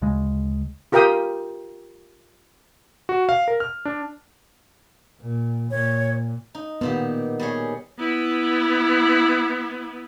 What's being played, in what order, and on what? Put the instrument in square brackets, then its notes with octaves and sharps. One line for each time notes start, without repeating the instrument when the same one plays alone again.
[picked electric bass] D2 C#3 G#3
[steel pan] F4 G4 A#4 F5 G5 D#6
[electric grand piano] F#4
F5
A#4
F6
D4
[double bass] A#2
[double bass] A#2 [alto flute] C#5
[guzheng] D#4
[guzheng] A#2 D#3 G4 [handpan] B3
[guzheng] G3 G#4 C#5
[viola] B3 E4